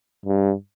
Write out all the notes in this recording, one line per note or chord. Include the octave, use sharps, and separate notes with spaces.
G2